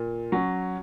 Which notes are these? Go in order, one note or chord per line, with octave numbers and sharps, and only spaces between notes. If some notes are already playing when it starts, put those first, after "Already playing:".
Already playing: A#2
F#3 C#4